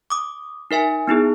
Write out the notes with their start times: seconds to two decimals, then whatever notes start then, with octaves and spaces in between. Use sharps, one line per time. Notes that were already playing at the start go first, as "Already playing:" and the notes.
0.10 D6 D#6
0.71 D#4 A#4 E5 G#5
1.07 B3 D#4 E4 G#4